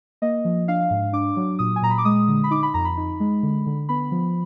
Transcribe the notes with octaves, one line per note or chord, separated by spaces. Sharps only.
A#3 D#5
F3
D4 F5
G#2
D4 D6
F#3
A#2 D#6
G#5
A#2 A#5
B5
D6
G#3 D#6
D3
B5
D#4 D6
B5
F2 A#5
B5
D#4
G#3
D3
D3
B3 B5
F3